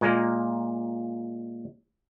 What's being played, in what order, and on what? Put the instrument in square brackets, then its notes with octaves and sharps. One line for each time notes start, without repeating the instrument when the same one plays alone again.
[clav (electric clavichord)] A#2 G#3 A#3